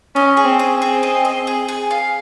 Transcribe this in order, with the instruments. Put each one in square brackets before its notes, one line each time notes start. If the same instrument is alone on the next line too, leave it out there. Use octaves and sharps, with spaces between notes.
[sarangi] C#4 [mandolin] D#5
[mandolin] G#4
[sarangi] C4
[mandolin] G#4
[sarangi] C4
[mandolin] G#4
D#5
D#5
G#4
G#4
F5